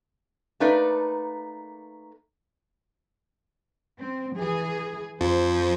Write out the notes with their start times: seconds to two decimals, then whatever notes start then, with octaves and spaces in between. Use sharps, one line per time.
0.60 A3 A#3 D#4 B4 D5
4.00 C4
4.37 E3 G#4
5.21 F2 F3 C5